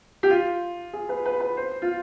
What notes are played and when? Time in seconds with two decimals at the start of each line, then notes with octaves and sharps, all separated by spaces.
0.23 G4
0.30 F4
0.93 G#4
1.09 B4
1.25 B4
1.40 B4
1.57 C5
1.82 F4